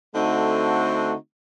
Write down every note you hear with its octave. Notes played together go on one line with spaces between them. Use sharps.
D3 A3 C4 D#4 F#4